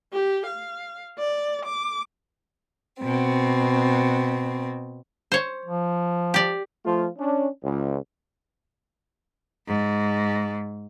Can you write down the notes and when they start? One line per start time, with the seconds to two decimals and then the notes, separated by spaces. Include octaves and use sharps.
0.13 G4
0.46 F5
1.19 D5
1.66 D6
3.01 B2 C4
5.32 C5 C#5
5.66 F3
6.34 G4 D5
6.85 F3 A3 F4
7.18 C#4 D4
7.63 C#2
9.67 G#2